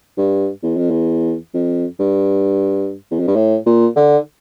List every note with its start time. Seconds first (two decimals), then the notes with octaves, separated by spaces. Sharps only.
0.17 G2
0.63 E2
0.77 F2
0.90 E2
1.54 F2
1.99 G2
3.11 E2
3.19 F2
3.27 G2
3.36 A2
3.66 A#2
3.96 D3